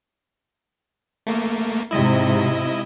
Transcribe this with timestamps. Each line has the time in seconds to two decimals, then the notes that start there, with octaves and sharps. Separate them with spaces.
1.27 A3 A#3
1.91 G#2 C3 E4 D#5